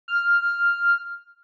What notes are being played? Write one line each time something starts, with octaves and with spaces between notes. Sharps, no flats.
F6